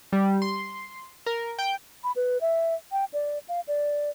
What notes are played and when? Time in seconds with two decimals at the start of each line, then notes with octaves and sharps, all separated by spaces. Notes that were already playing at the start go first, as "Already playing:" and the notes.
0.12 G3
0.42 C6
1.26 A#4
1.59 G5
2.04 B5
2.16 B4
2.41 E5
2.92 G5
3.13 D5
3.48 F5
3.68 D5